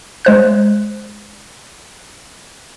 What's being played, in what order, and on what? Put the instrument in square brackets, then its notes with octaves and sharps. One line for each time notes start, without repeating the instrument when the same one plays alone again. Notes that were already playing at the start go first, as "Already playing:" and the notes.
[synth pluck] G#3 C5 F#6